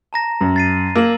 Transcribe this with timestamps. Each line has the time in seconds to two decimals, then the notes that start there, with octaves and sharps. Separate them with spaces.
0.13 A5 A#5 A#6
0.41 F#2
0.56 A6 C7 D#7
0.95 A#3 E6 E7 F#7